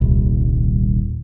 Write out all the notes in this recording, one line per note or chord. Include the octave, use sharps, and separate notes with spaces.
D#1 C2